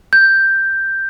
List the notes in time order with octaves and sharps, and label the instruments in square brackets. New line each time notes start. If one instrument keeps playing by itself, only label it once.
[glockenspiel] G6